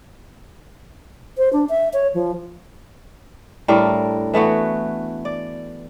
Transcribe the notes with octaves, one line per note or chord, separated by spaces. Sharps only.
C5
D4
E5
C#5
F3
A2 G3 D4 A#4
E3 A3 B3 F#4
D5